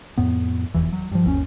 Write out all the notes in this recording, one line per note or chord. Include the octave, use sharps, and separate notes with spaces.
F2 A2 B3
F1 E2 E3
F#3
G2 F3
G1 D#2 C4 C#4